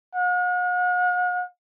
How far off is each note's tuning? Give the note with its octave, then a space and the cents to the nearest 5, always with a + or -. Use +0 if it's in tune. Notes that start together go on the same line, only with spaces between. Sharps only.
F#5 -45